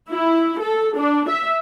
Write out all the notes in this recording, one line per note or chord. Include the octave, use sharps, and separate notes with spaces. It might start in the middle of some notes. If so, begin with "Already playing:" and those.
E4
A4
D4
E5